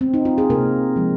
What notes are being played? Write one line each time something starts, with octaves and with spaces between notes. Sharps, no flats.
C4
D#4
F4
G#4
C3 A#3 A#4
F3 G#3